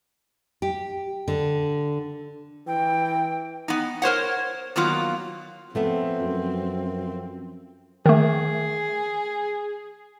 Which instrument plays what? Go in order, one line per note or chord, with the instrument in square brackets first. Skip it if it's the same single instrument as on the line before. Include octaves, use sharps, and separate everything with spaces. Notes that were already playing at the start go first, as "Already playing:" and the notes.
[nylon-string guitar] G4
D3
[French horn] E3 [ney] G5
[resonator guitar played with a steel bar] B3 D#4
A#4 C5 C#5 F#5
D#3 F#3 A#3 B3 F4
[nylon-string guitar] F3 A3 B3 [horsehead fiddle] C4
[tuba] F#2
[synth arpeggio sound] D#3 A3 [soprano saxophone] G#4